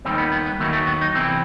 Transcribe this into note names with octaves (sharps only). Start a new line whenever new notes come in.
D#2 D#3 G3 C4
B3
B3
B3
D#2 D#3 F#3 A3
A3
B3
D#4
E2 C3 E3 C4